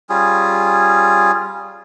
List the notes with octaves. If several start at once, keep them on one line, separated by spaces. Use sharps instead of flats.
G3 C#4 F4 G#4